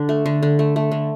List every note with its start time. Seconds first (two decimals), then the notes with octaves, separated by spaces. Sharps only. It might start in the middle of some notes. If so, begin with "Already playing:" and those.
Already playing: D3 D4
0.09 A3
0.26 D3
0.43 D3
0.59 A3
0.76 A3
0.92 D3